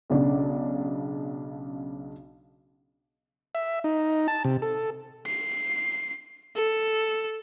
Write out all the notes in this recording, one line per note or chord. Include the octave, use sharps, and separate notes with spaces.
B1 C#3 D4
E5
D#4
A5
C3
A4
C7
A4